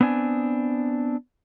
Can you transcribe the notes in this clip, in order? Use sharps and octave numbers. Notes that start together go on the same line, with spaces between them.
B3 C4 D4 G#5